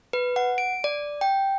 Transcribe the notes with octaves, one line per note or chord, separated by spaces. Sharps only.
B4
F#5
D7
D5
G5